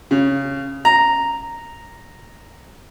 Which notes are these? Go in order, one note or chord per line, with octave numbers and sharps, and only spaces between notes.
C#3
A#5